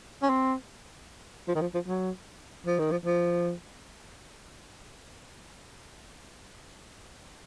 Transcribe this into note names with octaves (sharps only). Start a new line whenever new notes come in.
C#4
C4
F3
D#3
F3
F3
F#3
F3
D#3
F3
F3